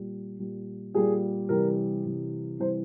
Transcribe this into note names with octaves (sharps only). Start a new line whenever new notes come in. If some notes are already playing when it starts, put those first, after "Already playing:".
Already playing: A#2 G3
A#2 G3
A#2 G3 G#4
C3 E3 G3 A#4
C3 E3 G3
C3 E3 G3 C5